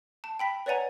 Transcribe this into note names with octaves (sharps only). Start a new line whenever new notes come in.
A5
G5 B5 B6
B4 C#5 D5 F#5 G#5 A#5